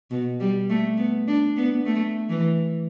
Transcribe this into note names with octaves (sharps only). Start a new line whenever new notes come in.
B2
G3
A3
B3
D4
B3
A3
E3